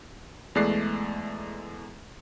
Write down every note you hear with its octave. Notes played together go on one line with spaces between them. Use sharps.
E2 G#3 A3 D5 F#6 C7